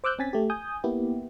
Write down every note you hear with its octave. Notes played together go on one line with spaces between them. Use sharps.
C5 D6 E6 F#6 G6
C4 C#4 G#5 A6 B6
A3 G4
G#5 D#6 G6
A#3 B3 E4 G4